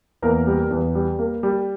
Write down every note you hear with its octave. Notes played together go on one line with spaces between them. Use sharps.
E2 A#3 A#4
G3
E2
G3
A#3
G3